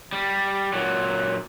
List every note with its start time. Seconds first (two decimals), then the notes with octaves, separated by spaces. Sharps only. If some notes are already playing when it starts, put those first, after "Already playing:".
0.13 G3
0.73 A#2 F#3